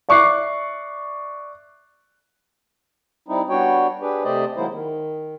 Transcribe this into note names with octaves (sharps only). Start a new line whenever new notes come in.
D5 E5 C#6 D6 F#6 C7
G3 C4 D#4 E4
G3 B3 D4 F#4 C#5 G5
D4 G4 G#4 B4
C3 A3 G4 C5 D5 D#5
D#3 F#3 G#3 A#3 E4 C5
D#3